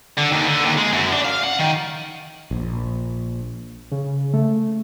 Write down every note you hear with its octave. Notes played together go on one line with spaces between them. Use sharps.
D3
D#2
D3
D#2
G#3
F#2
D4
F5
F#5
D#3
A#1
C#3
A3